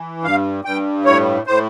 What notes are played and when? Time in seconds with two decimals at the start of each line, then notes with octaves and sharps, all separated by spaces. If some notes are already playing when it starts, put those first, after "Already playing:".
Already playing: E3
0.23 G2 F5
0.65 G2 G5
1.05 A2 C#5
1.47 A2 C5